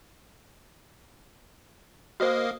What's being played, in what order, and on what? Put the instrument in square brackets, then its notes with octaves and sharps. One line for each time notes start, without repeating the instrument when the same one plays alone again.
[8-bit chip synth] A#3 D#5 F5 [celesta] F#4 C5